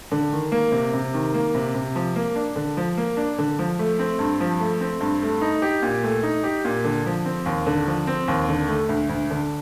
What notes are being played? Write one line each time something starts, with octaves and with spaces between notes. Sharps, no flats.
D3
D#3
A#3
C3
C3
D#3
A#3
C3
C3
F3
A#3
D4
D3
F3
A#3
D4
D3
F3
A3
C4
G2
F3
A3
C4
G2
A3
D#4
G4
A#2
A3
D#4
G4
A#2
D3
F3
C4
D#2
D3
F3
C4
D#2
D3
A3
D2
D2
D3